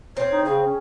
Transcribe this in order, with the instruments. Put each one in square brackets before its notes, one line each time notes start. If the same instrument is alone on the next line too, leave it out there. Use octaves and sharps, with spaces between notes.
[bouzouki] C4 [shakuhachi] C#5
[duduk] D#4
[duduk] C#3 [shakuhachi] G#4
[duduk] C#4